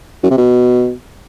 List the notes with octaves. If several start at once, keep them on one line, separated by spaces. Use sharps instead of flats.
F#2
C3
B2